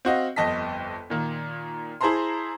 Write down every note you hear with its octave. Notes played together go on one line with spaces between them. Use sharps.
C4 F#4 D#5 F5
G1 F2 D#5 A5 B6
A#2 D#3 A#3
E4 G#4 C5 A5 A#5 C6